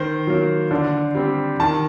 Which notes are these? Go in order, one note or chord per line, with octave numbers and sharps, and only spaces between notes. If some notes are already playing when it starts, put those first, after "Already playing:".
Already playing: D#3 C5
F#3 A#3
D3
G3 C4
D#3 A5